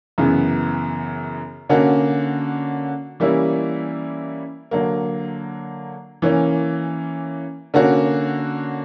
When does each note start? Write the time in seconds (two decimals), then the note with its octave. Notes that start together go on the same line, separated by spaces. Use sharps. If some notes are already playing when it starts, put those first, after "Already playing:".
0.18 F#2 C#3 E3 B3
1.69 D3 A#3 C#4 F#4
3.20 E3 G3 A#3 C#4 E4
4.71 D3 F#3 A#3
6.22 E3 A#3 C#4
7.74 D3 A#3 C#4 F#4